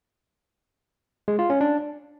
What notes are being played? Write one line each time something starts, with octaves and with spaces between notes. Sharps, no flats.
G#3
F4
C#4
D4